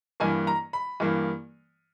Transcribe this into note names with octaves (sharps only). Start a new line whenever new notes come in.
G2 E3 A#3 G#5
A#5
B5
G2 E3 A#3